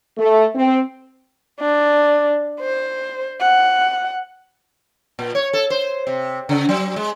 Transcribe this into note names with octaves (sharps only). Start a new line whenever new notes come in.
A3
C4
D4
C5
F#5
A#2
C#5
A4
C5
C3
C#3
F#3
G#3